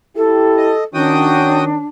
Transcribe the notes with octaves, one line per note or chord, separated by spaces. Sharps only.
E4 G4 A4
D#5
D#3 C#4 D4 F#4 G5 D#6